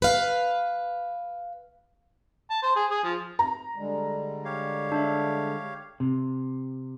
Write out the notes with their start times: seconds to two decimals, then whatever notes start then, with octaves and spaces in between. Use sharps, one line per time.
0.02 B4 F5
2.50 A5
2.62 C5
2.76 G#4
2.90 G#4
3.04 F3
3.39 A#5
3.76 D3 G3 G#3
4.45 G4 C#5 F5
4.92 D4 E5
6.00 C3